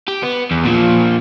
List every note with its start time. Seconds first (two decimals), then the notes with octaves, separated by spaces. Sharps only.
0.08 G4
0.23 B3
0.51 E2
0.65 A#2 F3